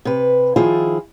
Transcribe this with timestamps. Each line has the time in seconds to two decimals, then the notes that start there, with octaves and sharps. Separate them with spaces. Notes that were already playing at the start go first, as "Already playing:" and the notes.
0.05 C3 B4
0.56 D#3 F3 E4 F4 G#4